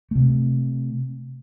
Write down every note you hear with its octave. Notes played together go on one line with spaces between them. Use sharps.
C3 A3